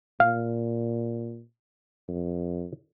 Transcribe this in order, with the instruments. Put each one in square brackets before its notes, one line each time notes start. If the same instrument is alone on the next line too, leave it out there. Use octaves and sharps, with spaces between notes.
[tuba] A#2 [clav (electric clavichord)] F5
[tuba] F2